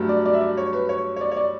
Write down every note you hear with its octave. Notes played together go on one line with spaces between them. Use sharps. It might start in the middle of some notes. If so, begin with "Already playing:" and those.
Already playing: G2 F#3 A3
D5
D5
E5
D5
C#5
B4
C#5
C#5
D5
C#5
D5